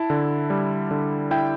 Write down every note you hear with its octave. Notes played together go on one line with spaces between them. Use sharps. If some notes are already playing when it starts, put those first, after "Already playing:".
Already playing: E4 A5
D3
G3
D3
E4 G5